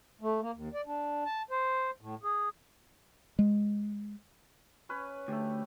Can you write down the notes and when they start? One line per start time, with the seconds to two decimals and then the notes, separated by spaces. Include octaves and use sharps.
0.21 A3
0.42 A#3
0.54 D#2
0.74 D5
0.86 D4
1.25 A5
1.51 C5
2.01 A2
2.23 G#4
3.39 G#3
4.89 C#4 B4 C#5
5.28 D2 A3 G4